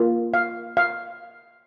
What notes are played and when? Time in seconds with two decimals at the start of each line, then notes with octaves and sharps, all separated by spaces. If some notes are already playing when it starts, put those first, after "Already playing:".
Already playing: A#3 F4
0.34 F5
0.77 F5